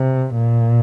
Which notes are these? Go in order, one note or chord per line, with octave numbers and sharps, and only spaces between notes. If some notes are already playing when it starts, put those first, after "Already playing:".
Already playing: C3
A#2